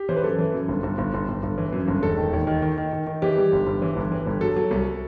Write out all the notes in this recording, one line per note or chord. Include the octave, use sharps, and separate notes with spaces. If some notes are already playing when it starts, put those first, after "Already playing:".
Already playing: G4
E3 C5
B4
F#2 A4
E3
F#2
G1
G1
G1
G1
G1
G1
E3
F#2
G1
E1 A4
D#3
D#2
D#3
D#3
D#3
D#3
D#3
E3 G4
G3
G1
G1
E3
G1
E3
G1
F#3 A4
F#3
C2